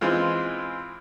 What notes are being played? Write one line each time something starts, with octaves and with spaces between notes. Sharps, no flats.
E3 G#3 C4 F4